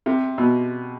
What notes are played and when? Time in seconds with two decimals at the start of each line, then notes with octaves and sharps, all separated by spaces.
0.06 C3
0.38 B2